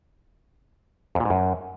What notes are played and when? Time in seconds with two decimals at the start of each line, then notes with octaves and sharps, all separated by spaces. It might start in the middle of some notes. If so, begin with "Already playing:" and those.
1.15 F2
1.20 A#2
1.25 G#2
1.30 F#2